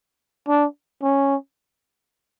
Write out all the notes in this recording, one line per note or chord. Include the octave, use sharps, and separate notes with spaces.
D4
C#4